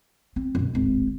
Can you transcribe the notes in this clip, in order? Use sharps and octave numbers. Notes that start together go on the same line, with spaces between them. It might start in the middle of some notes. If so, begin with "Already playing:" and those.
C4
F#2 B2
D1 G#1